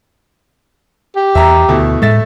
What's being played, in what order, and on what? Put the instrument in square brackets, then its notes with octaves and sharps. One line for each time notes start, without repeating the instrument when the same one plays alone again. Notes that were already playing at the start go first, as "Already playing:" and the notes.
[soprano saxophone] G4
[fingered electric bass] E2 [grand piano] E5 A#5
[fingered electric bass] D2 [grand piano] B2 A3 E4
[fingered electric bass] A2 G#3 [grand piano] A3 E5 A6